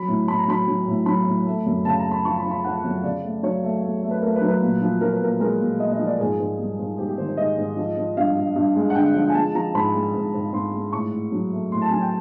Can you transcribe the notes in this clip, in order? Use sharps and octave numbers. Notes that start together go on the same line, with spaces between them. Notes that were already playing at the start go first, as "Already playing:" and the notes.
Already playing: F#3 B5
A2
A2 B5
A#5
F#3 B5
F#3
A2
F#3 B5
A2
A3
F#2
C#3 A5
A#5
A3
B5
F3 C#6
B5
F3
B5
F3 F#5
F#2
C#3 D5
A3
F#3 C#5
A3
A3
A3
B4
A3 A#4
B4
F#3
B4
A#2
F3
F3 A#4
B4
A#2 A#4
G#3 A#4
A#2
A#2 D#5
D#5
F3
D5
G#2 G#4
G#2
G3
G#2
G#2 G4
G4
D#3 C5
C5
G#2 D#5
G#2
F3
F3
G2 F5
G2
G2
G#3
F#5
D3 G5
F3
G#5
G#3 A5
F3 A#5
G#2 B5
G#3
G#2
G#2
G#2 C6
G#3
A2 C#6
A2
F#3
A3
A2 C6
A5
F#3 G#5
G5